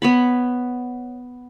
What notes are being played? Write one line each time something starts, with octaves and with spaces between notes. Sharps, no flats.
B3 C#5 B5